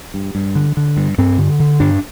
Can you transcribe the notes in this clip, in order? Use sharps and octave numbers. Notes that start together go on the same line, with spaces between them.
G2
G2
D3
D3
G2
G2 C4
D3
D3
G2 D4